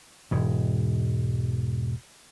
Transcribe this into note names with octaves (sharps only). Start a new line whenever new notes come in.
E1 G#2